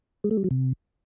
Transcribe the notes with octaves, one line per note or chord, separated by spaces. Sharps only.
G#3
A3
G3
F#3
C3